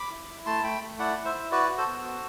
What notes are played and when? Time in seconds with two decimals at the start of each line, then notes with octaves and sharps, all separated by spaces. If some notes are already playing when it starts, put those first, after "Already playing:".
Already playing: B5 D6
0.11 E4
0.29 E4
0.46 A3 A5 C6
0.64 A3 G5 B5
0.82 A3
0.99 E4 D5 F#5
1.17 E4
1.25 C5 E5
1.34 E4
1.51 F#4 B4 D5
1.69 F#4
1.78 A4 C5
1.86 B3
2.04 F#4